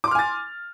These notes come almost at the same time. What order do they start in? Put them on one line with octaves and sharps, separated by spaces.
D6 C6 F6 G#5 A6